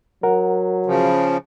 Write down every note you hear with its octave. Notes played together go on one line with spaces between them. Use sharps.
F#3 A#4 F#5
C#3 F3